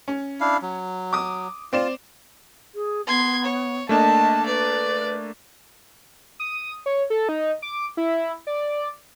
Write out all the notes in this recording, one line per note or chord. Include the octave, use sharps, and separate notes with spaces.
C#4
D4 E4 F5
F#3
D6 D#6
C4 F4 D5 E7
G#4
B3 C6 G#6
C#5
A3 A#3 D4 D#5 A5
B4 D5
D#6
C#5
A4
D#4
D6
E4
D5